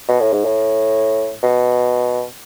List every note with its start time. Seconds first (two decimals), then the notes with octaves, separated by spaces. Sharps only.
0.09 B2
0.20 A2
0.33 G#2
0.45 A2
1.43 B2